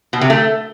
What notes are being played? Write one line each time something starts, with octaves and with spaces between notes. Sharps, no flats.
B2
C3
A3